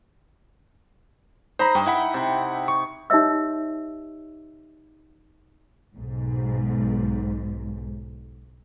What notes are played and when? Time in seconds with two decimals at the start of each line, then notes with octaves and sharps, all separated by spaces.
1.59 D#4 C5 A#5 B5
1.75 G2 G5
1.86 E4 F#5 B5
2.14 C3
2.68 C#6
3.10 D#4 G4 C#5 D#5 E5 E6
5.96 B1 G#2